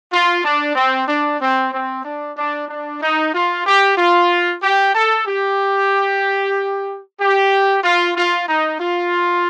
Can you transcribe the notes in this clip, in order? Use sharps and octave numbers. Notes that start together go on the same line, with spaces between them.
F4
D4
C4
D4
C4
C4
D4
D4
D4
D#4
F4
G4
F4
G4
A4
G4
G4
F4
F4
D#4
F4